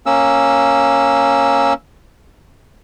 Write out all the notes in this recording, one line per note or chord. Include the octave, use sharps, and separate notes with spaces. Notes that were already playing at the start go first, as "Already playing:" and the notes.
A#3 C#4 E6